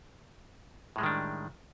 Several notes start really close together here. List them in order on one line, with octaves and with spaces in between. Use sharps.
A2 G#3 G3 D#3 D4